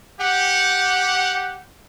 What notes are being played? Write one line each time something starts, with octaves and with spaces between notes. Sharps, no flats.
G4 F#5